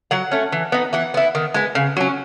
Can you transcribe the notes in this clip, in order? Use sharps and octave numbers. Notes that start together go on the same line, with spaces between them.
F#3 F#5
A3 C#4
E3
B3 D#4
E3 F#5
B3 E4
D#3
G#3 B3
C#3
F#3 C#4